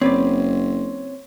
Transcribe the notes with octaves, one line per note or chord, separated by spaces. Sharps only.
F#1 C4 B4 C#5 D5